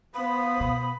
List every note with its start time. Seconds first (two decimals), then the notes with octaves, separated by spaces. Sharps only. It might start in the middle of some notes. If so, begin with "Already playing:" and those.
0.14 B3 C5 F5 B5 D#6
0.60 B2